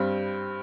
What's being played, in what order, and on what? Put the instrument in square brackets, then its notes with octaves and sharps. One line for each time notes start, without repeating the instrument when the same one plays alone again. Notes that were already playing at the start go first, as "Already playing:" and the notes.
Already playing: [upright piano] G2 G3 C4